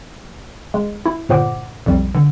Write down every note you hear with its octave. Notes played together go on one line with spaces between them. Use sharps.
G#3
E4
G1 A#2 C5 F#5 D6
B1 F2 G3
D3